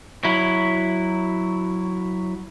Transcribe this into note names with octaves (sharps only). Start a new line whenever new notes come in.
F#3 E4